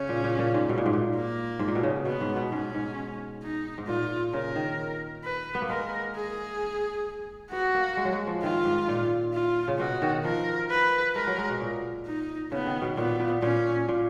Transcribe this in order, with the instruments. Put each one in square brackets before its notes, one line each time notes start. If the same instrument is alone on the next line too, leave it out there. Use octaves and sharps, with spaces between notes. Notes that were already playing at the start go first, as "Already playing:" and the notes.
Already playing: [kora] C#3 [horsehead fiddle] C#4
[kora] A#2
A#2
A#2
G#2
B2
A#2
G#2
A#2
[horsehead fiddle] A#3
[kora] G#2
A#2
B2
C#3
[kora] B2 [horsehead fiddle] B3
[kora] G#2
B2
[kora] G#2 [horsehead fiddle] C#4
[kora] G#2
[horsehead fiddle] D#4
[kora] G#2
[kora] A#2 [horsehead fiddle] F4
[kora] C#3 [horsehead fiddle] A#4
[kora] D#3
[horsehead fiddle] B4
[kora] B3
A#3
[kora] G#3 [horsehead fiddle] A#4
[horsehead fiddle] G#4
[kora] B3 [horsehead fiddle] F#4
[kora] A#3
G#3
F#3
G#3
F3
[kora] D#3 [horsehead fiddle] F4
[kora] G#2
A#2
[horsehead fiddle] F4
[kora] C#3
[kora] B2 [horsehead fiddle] F#4
[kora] D#3
[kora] F3 [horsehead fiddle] A#4
[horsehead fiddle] B4
[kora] G#3 [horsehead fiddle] A#4
[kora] F#3
G#3
B2
A#2
[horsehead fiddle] D#4
[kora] C#3 [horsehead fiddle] B3
[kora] D#3
B2
[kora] A#2 [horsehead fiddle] B3
[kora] A#2
[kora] A#2 [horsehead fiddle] C#4
[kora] A#2